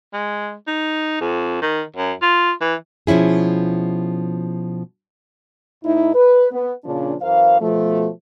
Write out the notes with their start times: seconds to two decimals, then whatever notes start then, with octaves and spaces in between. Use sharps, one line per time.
0.13 G#3
0.67 D#4
1.21 F2
1.62 D#3
1.96 F#2
2.22 F4
2.61 E3
3.07 B2 F3 C#4 E4 G#4
5.84 A2 D#4 E4
6.14 B4
6.52 B3
6.84 A#2 C#3 F3 D4
7.21 F#2 E3 A#4 C5 F5
7.60 B2 F3 A3